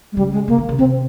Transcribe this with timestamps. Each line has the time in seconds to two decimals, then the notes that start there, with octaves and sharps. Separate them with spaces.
0.12 G#3
0.17 C#3 G3
0.32 G#3
0.48 C#3 A#3
0.58 D#3
0.69 C#3
0.78 C3 C4